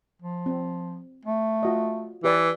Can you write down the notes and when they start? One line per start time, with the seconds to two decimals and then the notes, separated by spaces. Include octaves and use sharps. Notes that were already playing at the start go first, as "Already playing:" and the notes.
0.22 F3
0.46 C4
1.26 A3
1.63 F4 F#4 D#5
2.24 E3 G4 B4 D5